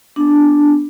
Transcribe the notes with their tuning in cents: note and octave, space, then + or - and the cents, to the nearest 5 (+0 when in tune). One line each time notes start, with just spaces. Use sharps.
B3 +0 D4 +0